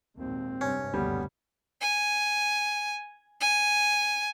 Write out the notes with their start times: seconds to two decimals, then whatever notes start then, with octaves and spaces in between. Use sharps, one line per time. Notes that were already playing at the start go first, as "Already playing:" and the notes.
0.17 G#1 D#2 A#2 C4
0.61 G2 C3 C#4
0.94 F#1 D2 B2 G3 B3
1.81 G#5
3.41 G#5